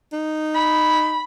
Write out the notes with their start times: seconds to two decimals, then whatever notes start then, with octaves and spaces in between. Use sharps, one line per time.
0.13 D#4
0.54 B5